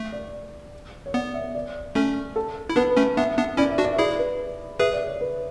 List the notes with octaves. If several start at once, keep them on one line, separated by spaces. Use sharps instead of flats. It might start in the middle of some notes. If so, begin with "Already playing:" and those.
Already playing: A3
D5
C#5
B3 D5
E5
D5
A3 C#4 A4
A4
E4
B3 D4 B4
B4
A3 C#4
B3 D4 E5
B3 D4
C#4 E4 D5
E5
D4 F#4
D5
E5
E4 G#4 D5
B4
G#4 B4 E5
D5
C#5
B4